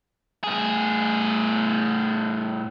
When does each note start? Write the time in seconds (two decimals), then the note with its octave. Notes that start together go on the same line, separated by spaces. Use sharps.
0.44 A2 G#4